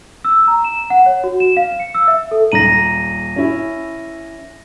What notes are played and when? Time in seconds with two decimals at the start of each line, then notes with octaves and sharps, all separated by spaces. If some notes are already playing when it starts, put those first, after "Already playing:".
0.25 E6
0.48 A#5
0.64 E7
0.90 F#5
1.06 C#5
1.24 F#4
1.40 E7
1.57 F5
1.80 C#7
1.95 E6
2.08 E5
2.31 A4
2.52 D#1 A#5 A#6 D#7 F#7
3.36 C#4 E4